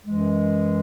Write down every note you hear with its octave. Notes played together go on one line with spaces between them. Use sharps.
F#2 E3 G#3